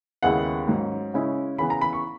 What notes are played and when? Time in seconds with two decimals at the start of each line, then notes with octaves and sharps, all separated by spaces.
0.23 D#2 C#3 G#3 B3 E4 F#5
0.68 G#2 F#3 C#4
1.14 C#3 G#3 C#4 E4
1.58 C#3 E3 B3 B5
1.70 A#5
1.81 B5
1.93 C#6